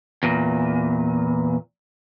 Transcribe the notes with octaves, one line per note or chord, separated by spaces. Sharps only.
E2 A#2